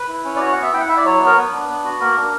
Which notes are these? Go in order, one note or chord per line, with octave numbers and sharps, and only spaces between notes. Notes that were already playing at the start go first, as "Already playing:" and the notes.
Already playing: B4
E4
C#4
D5
F#4 C#5
B3 F#5
E5
E4 G5
F#5
E4 E5
D5
F#3 C#5
B3
A#4
B3 B4
D4
B3
F#4
A#3 A#4
D4